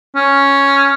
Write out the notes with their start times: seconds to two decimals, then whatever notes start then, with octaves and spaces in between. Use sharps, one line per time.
0.15 C#4